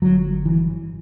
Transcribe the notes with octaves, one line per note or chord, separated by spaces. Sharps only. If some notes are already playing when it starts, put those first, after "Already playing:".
G1 F#3
E3